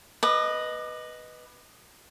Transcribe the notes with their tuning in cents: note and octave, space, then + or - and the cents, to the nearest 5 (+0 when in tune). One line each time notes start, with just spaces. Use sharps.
B4 +0 D#5 +0 D6 +35